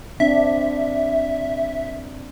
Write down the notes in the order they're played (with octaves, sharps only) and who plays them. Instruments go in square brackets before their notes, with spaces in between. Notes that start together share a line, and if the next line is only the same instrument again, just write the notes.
[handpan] C4 D4 [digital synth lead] E5